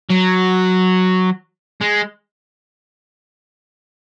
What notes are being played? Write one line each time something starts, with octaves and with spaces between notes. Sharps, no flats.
F#3
G#3